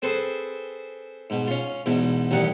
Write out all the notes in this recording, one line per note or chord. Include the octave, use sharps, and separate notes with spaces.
C4 G#4 A4 B4 C5
G#2 B2
C#4 F4
E2 G#2 B2
A1 D#2 G3 D#4 F#5